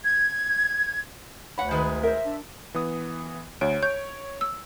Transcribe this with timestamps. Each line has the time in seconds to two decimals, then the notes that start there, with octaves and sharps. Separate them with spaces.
0.04 G#6
1.58 D2 C#5 F#5 B5
1.71 D#3 G#3 B4
2.03 A#4 C5 E5
2.26 D4
2.74 E3 B3 D#6
3.61 D2 C#5 D7
3.83 C#5 G6
4.41 E6